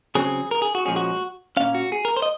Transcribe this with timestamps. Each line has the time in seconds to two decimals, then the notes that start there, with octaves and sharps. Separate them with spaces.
0.15 C#3 F#3 C4 G#4
0.51 A#4
0.62 G#4
0.75 F#4
0.85 A#2 F3 G#3 C#4 G#4
0.96 F#4
1.57 A#2 F#3 A#3 C#4 F5
1.75 F#4
1.92 G#4
2.05 A#4
2.17 C5
2.22 D#5